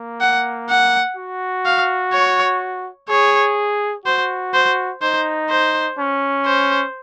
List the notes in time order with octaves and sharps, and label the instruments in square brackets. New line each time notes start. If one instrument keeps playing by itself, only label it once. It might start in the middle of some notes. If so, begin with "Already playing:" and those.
Already playing: [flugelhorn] A#3
[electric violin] F#5
F#5
[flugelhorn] F#4
[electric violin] F5
C#5
[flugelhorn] G#4 [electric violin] C#5
[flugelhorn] F#4 [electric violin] C5
[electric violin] C5
[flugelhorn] D#4 [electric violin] C5
[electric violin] C5
[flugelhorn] C#4
[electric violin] C5